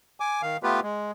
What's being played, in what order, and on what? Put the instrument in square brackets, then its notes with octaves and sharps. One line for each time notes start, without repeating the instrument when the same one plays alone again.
[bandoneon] G#5 D6
D#3 F5
A3 B3 F4 G4 B4
G#3